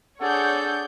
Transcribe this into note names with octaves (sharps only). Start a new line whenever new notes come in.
D4 G#4 A4 C#5 F#5 G6